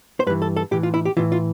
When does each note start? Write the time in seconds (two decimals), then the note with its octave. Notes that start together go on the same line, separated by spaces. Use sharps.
0.20 C5
0.27 G2 B4
0.30 E3
0.42 A4
0.57 A4
0.71 A2 E3 G4
0.83 F4
0.94 E4
1.05 G4
1.17 A2 E3 F4
1.32 F4